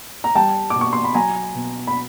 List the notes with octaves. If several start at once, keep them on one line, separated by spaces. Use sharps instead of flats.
A#5
G3 G5 A5
D6
B2
C#6
C6
B5
F#3 G#5 A#5
B2
B5